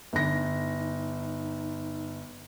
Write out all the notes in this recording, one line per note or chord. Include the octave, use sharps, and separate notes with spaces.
G1 D#4 A#6